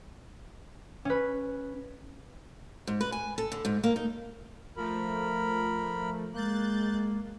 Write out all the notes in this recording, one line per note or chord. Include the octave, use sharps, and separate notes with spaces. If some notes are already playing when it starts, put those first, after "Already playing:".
C#4 B4
G#2
B4
G#5
A4
D3
G#2
A#3
D#4
F3 A3 A#4 B5
G#3 A#3 F#6 G6 A6